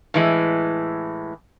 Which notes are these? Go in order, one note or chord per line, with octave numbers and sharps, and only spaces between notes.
A2 E3 G#3